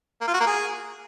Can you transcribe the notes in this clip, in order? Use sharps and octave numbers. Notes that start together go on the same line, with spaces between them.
A#3
F4
F#4
A#3
G#4